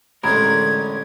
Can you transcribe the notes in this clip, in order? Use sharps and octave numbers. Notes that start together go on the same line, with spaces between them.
A1 D3 G#3 A#4 A#5 B5 G#6